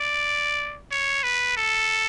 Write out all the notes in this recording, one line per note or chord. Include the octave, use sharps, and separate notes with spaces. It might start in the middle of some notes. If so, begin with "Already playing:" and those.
Already playing: D5
C#5
B4
A4